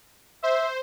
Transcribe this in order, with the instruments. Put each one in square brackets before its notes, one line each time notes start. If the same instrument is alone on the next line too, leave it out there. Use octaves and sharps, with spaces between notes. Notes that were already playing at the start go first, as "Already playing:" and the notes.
[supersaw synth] C5 [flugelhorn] E5